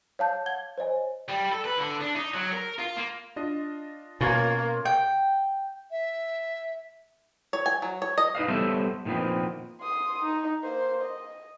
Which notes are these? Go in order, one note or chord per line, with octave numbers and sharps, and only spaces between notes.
C#5 F5 A5 G6
F#5 G#6 G7
C5 C#5 D#5 G#5
G3
A4
B4
D3
D4
D#4
F#3
A#4
F4
A#3
D4 F4 D#5
B2 A#3 C#4 F4 G#6 A6
G5
E5
C#5
G#5
F#3
C#5
D#5
D#4 B4 D#5 F5
G3 B3 A4 C5 C#5 E5
A#2 D#3 F3 B3 C4
C6 D#6
D#4
A#3 C5
D#5